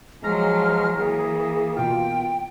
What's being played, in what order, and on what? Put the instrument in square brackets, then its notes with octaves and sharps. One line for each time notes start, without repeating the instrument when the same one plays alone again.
[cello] F3 F#3 [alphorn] G#3 [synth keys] A#5 [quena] F6
[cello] E3 [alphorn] A#3 [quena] G#4
[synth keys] B2 F4 [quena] G5